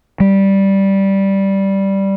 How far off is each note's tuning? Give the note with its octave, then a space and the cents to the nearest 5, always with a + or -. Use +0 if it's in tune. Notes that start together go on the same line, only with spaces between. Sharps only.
G3 -5